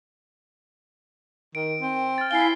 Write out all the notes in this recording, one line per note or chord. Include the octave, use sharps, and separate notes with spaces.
D#3 D7
C4
F6 A6
E4 F5 G#5 C7 G7